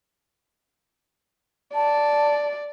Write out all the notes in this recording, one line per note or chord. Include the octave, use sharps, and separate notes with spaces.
D5 A5